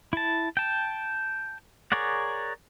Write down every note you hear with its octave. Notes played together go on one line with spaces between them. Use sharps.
E4 A5
G5 A5
G#4 A#4 C#5 D5 F#5